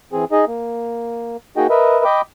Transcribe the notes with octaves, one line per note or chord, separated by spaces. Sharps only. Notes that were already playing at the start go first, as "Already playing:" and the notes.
E3 C4 G#4
D#4 G#4 D#5
A#3
A#3 D#4 F#4 G#4 D#5 G5
A#4 B4 D#5 E5
D#5 G5 B5 D6